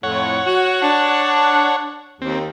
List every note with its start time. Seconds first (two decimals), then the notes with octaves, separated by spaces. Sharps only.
0.03 F2 A2 C#5 F#5
0.46 F#4
0.82 D4
2.22 D#2 C4